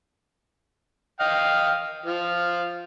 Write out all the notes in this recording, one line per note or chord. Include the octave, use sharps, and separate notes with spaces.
D#5 F5 G5
F3 F5